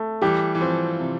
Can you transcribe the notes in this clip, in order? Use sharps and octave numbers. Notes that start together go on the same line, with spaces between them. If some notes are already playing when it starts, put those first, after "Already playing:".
Already playing: A3
E3 G3 G4
E3
F3 C4
C3